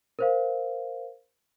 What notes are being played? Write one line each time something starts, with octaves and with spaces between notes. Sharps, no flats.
A#4 C5 F5